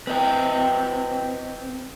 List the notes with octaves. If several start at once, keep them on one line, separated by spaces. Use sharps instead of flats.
C4 B4 D#5 G5